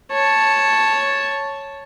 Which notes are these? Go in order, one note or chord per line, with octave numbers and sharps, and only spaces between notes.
C#5 A5